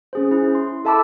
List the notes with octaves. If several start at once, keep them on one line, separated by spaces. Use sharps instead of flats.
C#4 G#4 C5
E4
C6
A4 E5 A5 B5 D6 E6